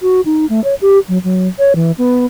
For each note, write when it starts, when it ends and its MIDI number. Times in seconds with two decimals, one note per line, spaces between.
0.02 0.21 66
0.25 0.48 63
0.49 0.63 57
0.64 0.74 73
0.81 0.98 67
1.08 1.18 54
1.24 1.48 54
1.59 1.73 73
1.75 1.91 52
1.98 2.26 59